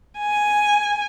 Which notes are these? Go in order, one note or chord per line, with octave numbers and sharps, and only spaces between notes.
G#5